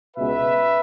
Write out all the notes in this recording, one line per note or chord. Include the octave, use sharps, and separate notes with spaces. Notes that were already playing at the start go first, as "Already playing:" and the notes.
C#2 B2 G#3 B3 B4 E5